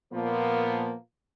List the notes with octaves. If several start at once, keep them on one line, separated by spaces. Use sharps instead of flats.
A#2 F3 A#3 B3